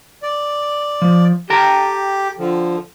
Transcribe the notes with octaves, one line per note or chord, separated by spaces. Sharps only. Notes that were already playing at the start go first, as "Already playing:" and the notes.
D5
F3
G4 A4 G5 A#5
D3 F3